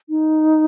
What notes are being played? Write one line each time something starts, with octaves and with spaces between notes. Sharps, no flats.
D#4